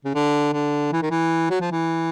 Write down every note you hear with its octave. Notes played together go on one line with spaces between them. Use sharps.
C#3
D3
D3
E3
D#3
E3
F#3
F3
E3